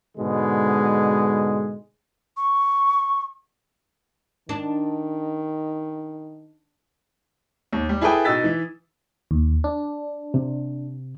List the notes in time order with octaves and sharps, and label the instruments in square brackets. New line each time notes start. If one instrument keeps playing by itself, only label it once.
[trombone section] G#2 B2 D3 G#3
[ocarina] C#6
[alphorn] D#3 [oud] D4
[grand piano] D#2
G3
E4 G#4 A4 B4 G5 D#6
B2 D#4 E6 A6 B6
E3
[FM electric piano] D#2
D4
[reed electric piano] C3